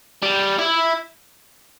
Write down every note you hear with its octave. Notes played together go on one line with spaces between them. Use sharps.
G3
E4